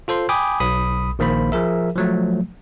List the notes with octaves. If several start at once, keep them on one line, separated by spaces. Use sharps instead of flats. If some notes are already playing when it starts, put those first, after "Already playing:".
F4 A4 C5 C6
G5 G#5 B5 D6 D#6
B1 B5 D#6
A#1 D#3 A#3 C5 B5
F3 G#4 A#4 E5
F3 F#3 A3